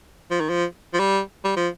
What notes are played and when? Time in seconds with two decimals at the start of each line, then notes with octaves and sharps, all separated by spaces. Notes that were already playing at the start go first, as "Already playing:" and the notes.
0.31 F3
0.40 D#3
0.49 F3
0.94 F3
0.99 G3
1.45 G3
1.56 F3